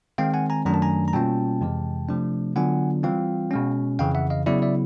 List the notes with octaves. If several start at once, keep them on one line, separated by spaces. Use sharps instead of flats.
D#3 G#3 C4 F5 G5
F#5 G#5
G#5 A#5
F#2 D#3 F#3 A3 D4 A#5
A5
G#5 A#5
A#5
B2 G3 A#3 C#4 F4 G5 A5
F2 C3 E3 G#3
C3 F3 A3 D4
D3 F#3 B3 D4 F4 F#5 G#5
E3 G3 C4 F4 F5 G5
B2 G#3 C#4
F2 C#3 E3 F5 G5
E5 F#5
D#5 F5
C#3 F#3 B3 E4 D5 E5
D5 E5